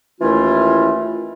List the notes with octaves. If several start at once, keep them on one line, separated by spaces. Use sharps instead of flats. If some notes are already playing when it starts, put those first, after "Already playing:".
D#2 E3 A3 C#4 E4 F4